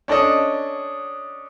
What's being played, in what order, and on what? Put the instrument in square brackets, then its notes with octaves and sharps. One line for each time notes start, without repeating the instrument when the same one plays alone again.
[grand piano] C#4 D4 A4 D#5